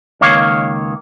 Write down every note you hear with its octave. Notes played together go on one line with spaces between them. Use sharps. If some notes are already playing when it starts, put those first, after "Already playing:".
C#2 D#3 A#3 C#5 F5